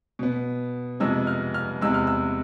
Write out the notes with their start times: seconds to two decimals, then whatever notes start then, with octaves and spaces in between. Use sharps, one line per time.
0.19 B2 B3
1.00 F2 C3 G#3 B3 E6
1.27 F6
1.54 F6
1.81 E2 C3 G#3 E6
1.94 F6
2.07 E6